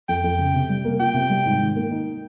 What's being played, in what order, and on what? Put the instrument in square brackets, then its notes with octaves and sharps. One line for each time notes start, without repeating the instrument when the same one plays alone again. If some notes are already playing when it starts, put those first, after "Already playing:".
[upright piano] F2 [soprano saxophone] G5
[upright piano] F2
C#3
C3
G3
A#3
[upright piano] F4 [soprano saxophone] G5
[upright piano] C3
G3
G#2
D#3
A#3
D#4